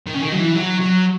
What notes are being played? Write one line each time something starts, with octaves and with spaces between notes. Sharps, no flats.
D#3
C#3
D#3
F#3
E3
F#3
F#3